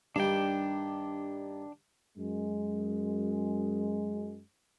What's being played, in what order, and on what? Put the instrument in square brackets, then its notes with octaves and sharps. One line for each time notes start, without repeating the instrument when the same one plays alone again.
[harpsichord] G2 D#3 G3 [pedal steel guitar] D4 G5
[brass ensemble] F#2 G#3